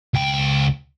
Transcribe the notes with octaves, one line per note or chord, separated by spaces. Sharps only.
C#2 G5